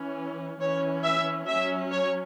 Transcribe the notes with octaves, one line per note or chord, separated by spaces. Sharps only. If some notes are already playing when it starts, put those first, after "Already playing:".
Already playing: E3 C#4
E3 C#4 C#5
E5
F#3 C#4 E5
C#5